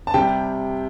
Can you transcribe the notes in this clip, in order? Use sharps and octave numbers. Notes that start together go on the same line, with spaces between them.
A5
C3 G3 G5